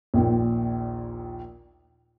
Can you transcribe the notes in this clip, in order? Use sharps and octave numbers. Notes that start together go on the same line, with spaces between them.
A#1 D#2 A#2